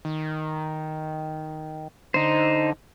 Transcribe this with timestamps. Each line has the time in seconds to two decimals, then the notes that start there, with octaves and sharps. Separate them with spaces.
0.05 D#3
2.14 D3 D#4 C5